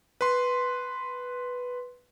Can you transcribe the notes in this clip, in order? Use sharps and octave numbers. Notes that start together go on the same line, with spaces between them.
B4 C6